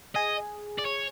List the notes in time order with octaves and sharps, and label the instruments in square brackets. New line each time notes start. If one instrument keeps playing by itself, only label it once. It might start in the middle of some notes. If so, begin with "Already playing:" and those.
[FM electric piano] G#4 [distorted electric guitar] D#5
[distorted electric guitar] D5
C#5